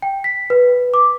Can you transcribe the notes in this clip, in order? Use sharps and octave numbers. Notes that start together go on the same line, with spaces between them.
G5
B6
B4
D6